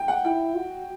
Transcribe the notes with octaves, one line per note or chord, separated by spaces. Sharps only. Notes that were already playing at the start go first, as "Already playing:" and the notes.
Already playing: G5
F#5
E4 G5
F#4